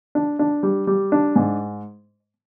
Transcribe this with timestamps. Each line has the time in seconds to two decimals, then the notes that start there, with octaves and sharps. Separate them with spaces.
0.15 D4
0.39 D4
0.63 G3
0.87 G3
1.12 D4
1.36 G#2